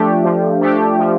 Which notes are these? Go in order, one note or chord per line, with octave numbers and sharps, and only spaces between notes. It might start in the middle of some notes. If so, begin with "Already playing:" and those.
Already playing: F3 A3 D4 G4
F3
A3 D4 G4
F3